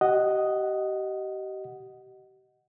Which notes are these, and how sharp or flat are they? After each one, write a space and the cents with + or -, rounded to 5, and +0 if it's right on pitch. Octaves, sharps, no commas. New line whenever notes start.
G4 -35 D#5 +0 F#5 +0